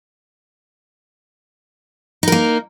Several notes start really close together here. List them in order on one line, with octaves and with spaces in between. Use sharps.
D#4 A#4 A#3